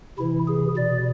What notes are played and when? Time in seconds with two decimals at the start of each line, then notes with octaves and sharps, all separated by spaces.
0.18 C3 E3 E4
0.48 G#4
0.77 B2 D5